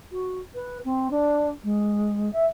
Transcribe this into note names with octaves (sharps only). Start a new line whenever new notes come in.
F#4
B4
C4
D4
G#3
E5